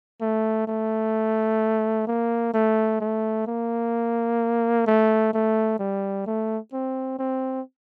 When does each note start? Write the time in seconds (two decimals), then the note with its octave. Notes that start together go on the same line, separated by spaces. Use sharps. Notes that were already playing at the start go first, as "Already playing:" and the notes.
0.21 A3
0.68 A3
2.07 A#3
2.54 A3
3.01 A3
3.47 A#3
4.87 A3
5.34 A3
5.79 G3
6.26 A3
6.73 C4
7.19 C4